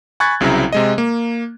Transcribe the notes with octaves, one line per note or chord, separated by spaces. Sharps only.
G#5 B5 C#6 F#6 G#6 A6
C2 C#3 F#3 C4 E4 A#5
C3 G#3 D#5
A#3